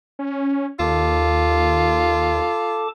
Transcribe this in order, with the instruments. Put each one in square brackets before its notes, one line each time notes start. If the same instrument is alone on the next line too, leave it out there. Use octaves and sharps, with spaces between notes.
[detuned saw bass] C#4
[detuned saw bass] D#2 [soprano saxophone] F4 [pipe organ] A4 A5 D6